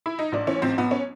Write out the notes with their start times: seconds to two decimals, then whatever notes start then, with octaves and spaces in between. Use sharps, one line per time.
0.06 E4
0.19 D#4
0.32 A1 D4
0.47 E3 C#4
0.62 A1 C4
0.78 A1 B3
0.91 C#4